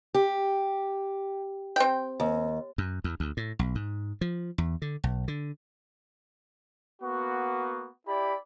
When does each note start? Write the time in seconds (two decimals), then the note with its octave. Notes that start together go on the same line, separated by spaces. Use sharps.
0.14 G4
1.76 C4 G5
2.20 D#2
2.78 F#2
3.04 E2
3.20 D2
3.37 A2
3.59 B1
3.75 G#2
4.21 F3
4.58 E2
4.82 D3
5.04 B1
5.28 D3
7.02 A#3 B3 F#4
8.07 E4 G4 D5 B5